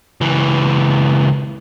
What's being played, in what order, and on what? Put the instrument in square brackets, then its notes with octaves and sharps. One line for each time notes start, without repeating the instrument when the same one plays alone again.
[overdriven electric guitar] C#2 E3